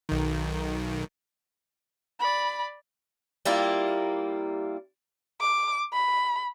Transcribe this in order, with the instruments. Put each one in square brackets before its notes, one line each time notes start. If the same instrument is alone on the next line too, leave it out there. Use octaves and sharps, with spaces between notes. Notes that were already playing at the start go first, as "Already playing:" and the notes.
[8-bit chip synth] B1 D#3
[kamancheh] D5 B5
[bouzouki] G3 A#3 E4 F4
[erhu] D6
B5